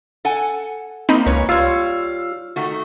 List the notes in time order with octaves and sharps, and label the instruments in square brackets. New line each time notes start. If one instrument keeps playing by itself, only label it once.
[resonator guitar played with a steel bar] A4 F#5 G#5
[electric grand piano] A#3 [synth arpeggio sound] C4 D#4 B5
[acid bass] C#2 [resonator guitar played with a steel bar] B4 C#5 A#5
[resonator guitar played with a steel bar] G3 C#5 [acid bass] F4 [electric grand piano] F5 E6
[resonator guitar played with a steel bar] D#3 A3 F#4